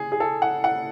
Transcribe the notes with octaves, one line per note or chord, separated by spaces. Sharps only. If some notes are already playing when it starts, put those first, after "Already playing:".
Already playing: G#4
G#4
A4
F#5
F#5